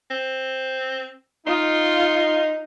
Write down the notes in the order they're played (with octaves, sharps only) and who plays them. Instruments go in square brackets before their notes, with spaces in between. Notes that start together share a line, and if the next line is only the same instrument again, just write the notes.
[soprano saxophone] C4
[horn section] D#4 [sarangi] F4 [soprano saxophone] C6